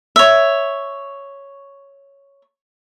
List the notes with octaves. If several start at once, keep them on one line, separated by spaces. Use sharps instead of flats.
C#5 E5